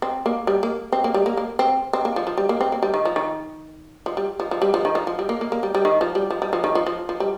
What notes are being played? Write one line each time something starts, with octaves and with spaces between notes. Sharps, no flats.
C4
A#3
G3
A#3
C4
A#3
G3
A#3
A#3
C4
C4
A#3
F3
F3
G3
A#3
C4
A#3
G3
D#3
F3
D#3
F3
G3
F3
F3
G3
F3
D#3
F3
F3
G3
A#3
A#3
A#3
G3
G3
D#3
F3
G3
F3
G3
F3
D#3
F3
F3
F3
G3